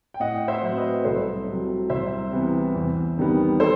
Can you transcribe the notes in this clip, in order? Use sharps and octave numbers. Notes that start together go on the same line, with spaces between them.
G5
A2 D#5 F#5
C5 E5
F#3 C4 C5
B4 D#5
C2 A4 C5
C3 F#3
C2 C5 E5
C3 E3 B3
E2
C3 D#3 G3 B3
A4 C5